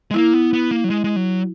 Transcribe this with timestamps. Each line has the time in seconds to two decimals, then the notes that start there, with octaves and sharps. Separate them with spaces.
0.11 G#3
0.14 A#3 E4
0.34 B3
0.53 B3
0.71 A#3
0.84 F#3
0.90 G#3
1.04 G#3
1.16 F#3